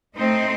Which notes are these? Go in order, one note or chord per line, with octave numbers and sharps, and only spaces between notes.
A2 A3 C4 D#4